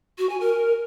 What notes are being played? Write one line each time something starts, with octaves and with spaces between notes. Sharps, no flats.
F#4
G#5
A#4